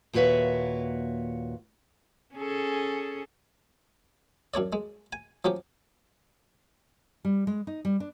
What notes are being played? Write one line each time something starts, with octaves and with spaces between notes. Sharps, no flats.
D#2 A#2 F#4 B4 C#5 E5
C#4 G#4 A4
F#2 D4 C#5 D5
G#3
G#5
F3 F#3 C#4 G4
G3
G#3
D#4
G3
D4